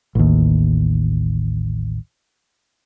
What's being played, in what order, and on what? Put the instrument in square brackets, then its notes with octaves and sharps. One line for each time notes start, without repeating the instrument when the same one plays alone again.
[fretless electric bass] A1 D#2